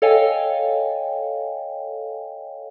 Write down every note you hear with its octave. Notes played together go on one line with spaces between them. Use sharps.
A4 C#5 D#5 F5 G5 G#5